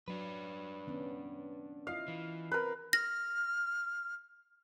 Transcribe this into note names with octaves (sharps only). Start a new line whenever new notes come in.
F#3 D4 B4
D#3 B3 C#4
E4 F4 D#5 F5
E3
C4 A#4 B4
F6 A#6